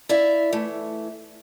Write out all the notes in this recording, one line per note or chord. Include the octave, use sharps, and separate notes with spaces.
E4 D5 E5 F5
E3 A3